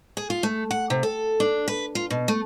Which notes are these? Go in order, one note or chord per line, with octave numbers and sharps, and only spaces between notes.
G#4
F4
A3
F#5
C3
A4
D4
B4
F4
B2
A3